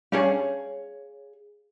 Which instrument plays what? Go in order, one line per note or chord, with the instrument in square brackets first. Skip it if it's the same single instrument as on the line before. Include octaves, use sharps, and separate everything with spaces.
[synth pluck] G3 C#4 D4 [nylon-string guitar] G#4 C#5 F5